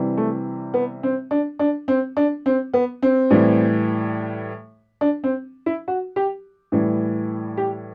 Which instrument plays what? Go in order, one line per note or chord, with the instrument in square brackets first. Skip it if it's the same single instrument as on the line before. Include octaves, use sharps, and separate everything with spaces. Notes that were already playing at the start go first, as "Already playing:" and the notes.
Already playing: [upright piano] C3 E3 G3
A3
B3
C4
D4
D4
C4
D4
C4
B3
C4
A2 E3 G3
D4
C4
E4
F#4
G4
A2 E3 G3
G4